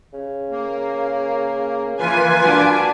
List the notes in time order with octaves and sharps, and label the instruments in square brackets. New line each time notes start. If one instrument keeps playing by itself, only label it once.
[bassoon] C#3
[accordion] A#3
[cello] E3 [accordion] A#3 F4 B4 [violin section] G#5
[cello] D4 [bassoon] F#4